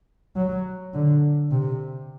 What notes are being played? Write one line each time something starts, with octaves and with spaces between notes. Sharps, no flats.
F#3
D3
C3